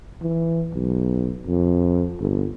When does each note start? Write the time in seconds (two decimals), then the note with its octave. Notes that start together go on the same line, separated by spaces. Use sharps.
0.22 E3
0.73 B1
1.47 F2
2.20 G1